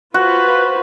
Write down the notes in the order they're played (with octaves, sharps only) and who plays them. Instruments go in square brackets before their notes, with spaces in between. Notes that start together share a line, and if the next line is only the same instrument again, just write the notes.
[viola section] F4 B4 C5 [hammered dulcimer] F#4